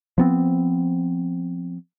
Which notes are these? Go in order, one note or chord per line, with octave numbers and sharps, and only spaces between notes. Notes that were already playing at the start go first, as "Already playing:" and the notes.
F3 B3 C4